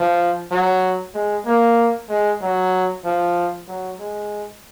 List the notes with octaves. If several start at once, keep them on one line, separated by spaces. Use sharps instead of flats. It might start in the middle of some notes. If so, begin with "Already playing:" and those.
Already playing: F3
F#3
G#3
A#3
G#3
F#3
F3
F#3
G#3